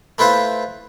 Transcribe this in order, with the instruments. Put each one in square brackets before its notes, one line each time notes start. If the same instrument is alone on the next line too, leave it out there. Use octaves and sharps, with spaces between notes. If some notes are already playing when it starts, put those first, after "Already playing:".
[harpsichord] A3 E4 F4 B4 C5